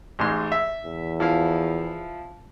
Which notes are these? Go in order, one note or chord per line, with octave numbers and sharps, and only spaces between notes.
A1 G#2 C6
E5
E2
F3 E4 F5